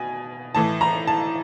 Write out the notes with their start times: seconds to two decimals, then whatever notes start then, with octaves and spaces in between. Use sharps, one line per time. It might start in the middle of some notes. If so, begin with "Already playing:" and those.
Already playing: B2 G#5
0.55 A2 E3 A5
0.81 A#5
1.07 A5